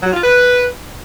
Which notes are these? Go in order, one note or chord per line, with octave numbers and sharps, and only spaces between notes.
F#3
F4
B4